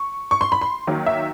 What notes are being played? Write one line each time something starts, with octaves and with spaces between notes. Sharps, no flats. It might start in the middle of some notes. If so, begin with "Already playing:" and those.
Already playing: C#6
C#6
C6
B5
C6
D#3 F#3 A#3
E5